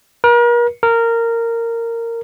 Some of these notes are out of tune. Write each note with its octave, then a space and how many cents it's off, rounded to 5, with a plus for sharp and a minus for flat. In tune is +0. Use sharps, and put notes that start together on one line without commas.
A#4 +40
A#4 -15